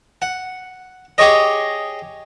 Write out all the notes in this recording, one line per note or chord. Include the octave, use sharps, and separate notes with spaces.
F#5
G4 G#4 C#5 D#5